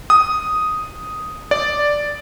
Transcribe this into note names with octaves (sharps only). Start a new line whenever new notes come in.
D#6
D5